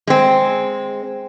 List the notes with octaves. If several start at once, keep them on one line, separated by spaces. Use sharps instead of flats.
G#3 C4